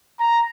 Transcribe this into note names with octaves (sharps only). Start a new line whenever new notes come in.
A#5